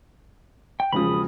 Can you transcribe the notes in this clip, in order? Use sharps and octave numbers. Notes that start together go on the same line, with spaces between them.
G5
E1 C#3 F3 B5 D#6